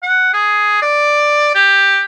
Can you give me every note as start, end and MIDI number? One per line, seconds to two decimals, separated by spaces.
0.03 0.29 78
0.33 0.78 68
0.82 1.53 74
1.55 2.02 67